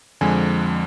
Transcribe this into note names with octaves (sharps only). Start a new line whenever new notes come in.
F2 D3 F3 G#3 G#5